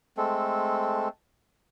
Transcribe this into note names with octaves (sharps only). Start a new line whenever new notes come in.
G#3 A3 C4 A4